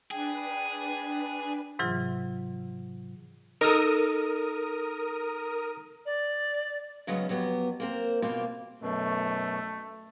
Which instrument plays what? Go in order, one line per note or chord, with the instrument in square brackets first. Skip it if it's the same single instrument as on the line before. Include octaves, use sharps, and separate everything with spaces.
[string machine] D4 B4 [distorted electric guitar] G#4 [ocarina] G5
[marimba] G#2 C3 E3 F#3 F4
[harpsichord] D#4 A4 [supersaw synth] A#4 D#6
[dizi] D5
[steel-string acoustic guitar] C#3 F#3 G#3 B3 C#4
F2 F#3 B3 F#4 G4
A#3 C4 A#4
B2 A#3 C4 F4 G4
[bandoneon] F#2 B2 [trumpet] A3